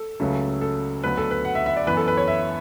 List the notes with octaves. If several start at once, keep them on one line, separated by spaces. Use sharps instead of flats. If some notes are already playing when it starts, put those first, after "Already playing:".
Already playing: A4
C#2 C#3 F#3 A3
A4
D2 D3 F#3 B3 B4
A4
B4
F#5
E5
E5
D5
F#2 E3 B3 B4
A4
B4
C#5
E5